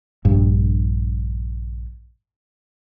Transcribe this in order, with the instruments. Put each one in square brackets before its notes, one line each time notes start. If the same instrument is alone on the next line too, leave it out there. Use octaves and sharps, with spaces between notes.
[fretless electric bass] A#1 G2